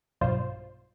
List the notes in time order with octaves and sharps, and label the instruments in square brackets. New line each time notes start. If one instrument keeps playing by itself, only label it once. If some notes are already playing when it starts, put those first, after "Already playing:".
[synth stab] B1 G2 B2 F4 C5